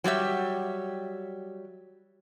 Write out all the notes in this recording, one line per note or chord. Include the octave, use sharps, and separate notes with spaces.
F#3 G3 G4 E5